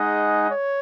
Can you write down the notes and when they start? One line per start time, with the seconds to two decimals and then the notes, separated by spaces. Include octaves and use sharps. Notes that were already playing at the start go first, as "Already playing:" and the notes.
Already playing: G#3 D#4 G#4 D#5 F#5
0.51 C#5